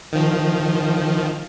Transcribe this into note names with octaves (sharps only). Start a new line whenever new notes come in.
D#3 F3